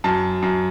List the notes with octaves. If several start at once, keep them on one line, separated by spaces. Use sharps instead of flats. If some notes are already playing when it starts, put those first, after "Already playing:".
F#2 A5
F#2